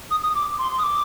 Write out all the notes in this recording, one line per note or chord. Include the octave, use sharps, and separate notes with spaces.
D#6
D#6
D6
C6
D#6
D6